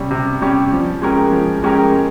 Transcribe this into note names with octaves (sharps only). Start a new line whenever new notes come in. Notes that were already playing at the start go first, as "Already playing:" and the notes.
Already playing: C3 G3 C#4 G4
C3
G3 C#4 G4
F3
G#3 C#4 G4 A#4
F3
G#3 C#4 G4 A#4
G#3